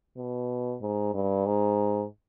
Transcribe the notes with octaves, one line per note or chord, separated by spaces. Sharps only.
B2
G#2
G2
G#2